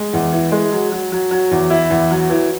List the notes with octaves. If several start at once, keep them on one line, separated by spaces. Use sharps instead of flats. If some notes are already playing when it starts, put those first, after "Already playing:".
Already playing: G#3
E2
E3
G#3
F#3
F#3
F#3
F#3
E2
E4
E2
F#3
E3